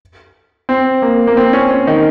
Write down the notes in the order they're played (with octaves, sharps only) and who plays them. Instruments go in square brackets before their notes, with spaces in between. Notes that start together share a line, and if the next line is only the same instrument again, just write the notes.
[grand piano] C4
A#3
A#3
C4
C#4
C#4
D#3